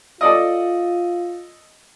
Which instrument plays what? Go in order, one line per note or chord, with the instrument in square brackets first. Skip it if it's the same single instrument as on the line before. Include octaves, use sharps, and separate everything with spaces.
[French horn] F4 [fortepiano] A4 D5 D#5